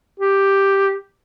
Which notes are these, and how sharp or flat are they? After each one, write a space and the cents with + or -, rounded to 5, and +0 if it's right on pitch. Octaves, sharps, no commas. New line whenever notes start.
G4 +0